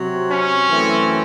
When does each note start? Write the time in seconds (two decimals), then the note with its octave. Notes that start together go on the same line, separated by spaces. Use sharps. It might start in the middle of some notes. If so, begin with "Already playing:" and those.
Already playing: C3 F#3 C4
0.28 C#4
0.68 F#2 E3 A3 C4